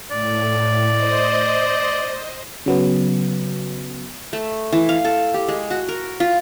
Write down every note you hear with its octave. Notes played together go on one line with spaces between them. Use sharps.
A2 D5
C5 D#5
C#3 F#3 B3
A3
E3
F5
A4
G4
G#3
F#4
A#4
F4